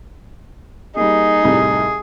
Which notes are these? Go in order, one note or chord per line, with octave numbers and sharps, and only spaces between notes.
G3 A#3 D#4 G#4
C2 A2 G3